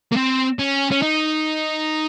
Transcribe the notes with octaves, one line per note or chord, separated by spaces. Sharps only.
A#3
C4
C#4
C#4
D#4